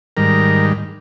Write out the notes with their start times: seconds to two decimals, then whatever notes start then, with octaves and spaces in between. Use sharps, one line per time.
0.17 G#2 D#3 G3 A#4